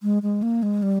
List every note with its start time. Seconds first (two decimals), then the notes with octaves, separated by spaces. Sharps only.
0.03 G#3
0.23 G#3
0.43 A#3
0.63 G#3
0.82 G3